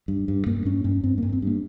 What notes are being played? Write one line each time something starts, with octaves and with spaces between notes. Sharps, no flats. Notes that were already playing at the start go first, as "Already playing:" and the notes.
G2
G2
G2 A#3
G2 C#4
G2 C#4
G2 C4
G2 A#3
C4
G2 A#3